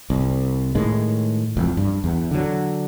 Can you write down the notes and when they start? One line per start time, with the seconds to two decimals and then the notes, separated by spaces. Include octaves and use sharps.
0.10 C2
0.75 A2 D#3 G#3
1.57 E1 F2
1.77 G2
2.04 E2
2.31 D3 F#3